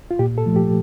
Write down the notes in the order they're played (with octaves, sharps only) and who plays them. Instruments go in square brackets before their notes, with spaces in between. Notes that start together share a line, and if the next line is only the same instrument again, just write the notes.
[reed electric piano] F4
A#2 G4
A4
F3 A3
G4